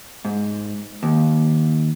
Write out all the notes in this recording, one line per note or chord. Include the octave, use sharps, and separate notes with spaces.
G#2
D#2